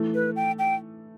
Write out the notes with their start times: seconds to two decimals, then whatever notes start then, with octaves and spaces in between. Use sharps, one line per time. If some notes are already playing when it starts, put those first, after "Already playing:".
Already playing: E3 A3
0.14 B4
0.36 G5
0.59 G5